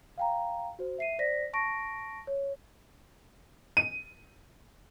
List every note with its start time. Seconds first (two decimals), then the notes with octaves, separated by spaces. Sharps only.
0.18 F5 G5 A#5
0.79 F#4 C5
0.98 E5 C7 D#7
1.19 C5 D5 A#6 B6
1.53 A5 C#6 A#6 D7
2.27 C#5
3.77 D#7